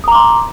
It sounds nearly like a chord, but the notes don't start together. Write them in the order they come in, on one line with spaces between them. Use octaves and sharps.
D#6 A#5 D6 C6